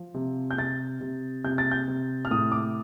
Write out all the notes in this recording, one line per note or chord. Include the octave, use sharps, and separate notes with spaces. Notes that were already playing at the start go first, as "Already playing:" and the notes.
Already playing: F3
C3
G6
C3 A6
C3
C3 G6
A6
G6
C3
F6
A2 D#6
D6